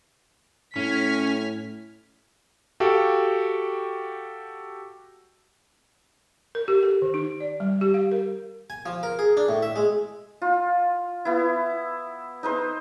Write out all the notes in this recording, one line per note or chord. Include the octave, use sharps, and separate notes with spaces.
A2 C#4 F6 G#6 B6
F#4 G4 A4 F5 G5
A#4
G4
A4
D#3
D#4
D5
G3
G4
F5
A#4
G#5
F3
A#4
G#4
D4
A2
E5
G#3
F4
B3 E4
D#4 B4 C5